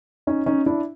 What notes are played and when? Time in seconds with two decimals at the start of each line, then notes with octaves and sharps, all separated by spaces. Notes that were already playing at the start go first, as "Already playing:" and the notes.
0.27 C#4 D#4
0.46 C#4 D#4
0.66 D4 E4